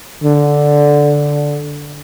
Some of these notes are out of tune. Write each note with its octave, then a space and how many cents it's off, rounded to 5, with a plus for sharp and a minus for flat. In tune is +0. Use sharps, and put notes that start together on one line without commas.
D3 -5